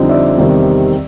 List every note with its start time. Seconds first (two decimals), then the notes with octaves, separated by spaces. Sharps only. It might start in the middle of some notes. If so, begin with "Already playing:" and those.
Already playing: F2 D3 G3 C4 D#4
0.09 D5 E5
0.37 E2 C3 D#3 G3 C4